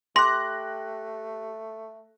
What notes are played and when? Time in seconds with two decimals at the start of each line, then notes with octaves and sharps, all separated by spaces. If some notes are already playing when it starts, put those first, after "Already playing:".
0.16 A3 G4 C6 F#6 A#6